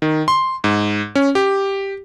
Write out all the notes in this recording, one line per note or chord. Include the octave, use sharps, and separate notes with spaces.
D#3
C6
G#2
C#4
G4